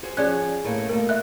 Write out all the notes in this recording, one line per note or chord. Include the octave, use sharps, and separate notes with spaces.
F#4 G#4 C5
F3 C#4 G#4 D5 G#5 F#6
A2 A3 A#3
B2 A3 A#3 A#4
D#5 E5 F#6